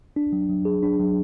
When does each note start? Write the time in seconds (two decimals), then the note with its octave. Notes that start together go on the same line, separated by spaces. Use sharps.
0.16 D4
0.33 F#3
0.49 F#3
0.65 G#4
0.83 D4
0.99 F#3